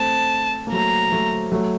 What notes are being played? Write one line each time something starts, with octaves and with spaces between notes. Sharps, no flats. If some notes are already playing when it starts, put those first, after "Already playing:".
Already playing: A3 C4 A5
A#3
F#3 A3 A#5
F#3 A3
F#3 A3